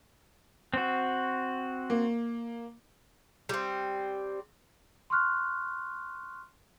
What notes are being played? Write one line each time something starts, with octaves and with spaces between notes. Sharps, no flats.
C4 F#4
A#3
G3 C4
C6 C#6 F6 F#6